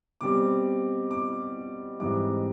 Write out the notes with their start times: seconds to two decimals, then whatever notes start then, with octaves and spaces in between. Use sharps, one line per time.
0.21 B2 G3 C4 D6
1.11 D6
2.00 G#2 E3 G3 C4 D6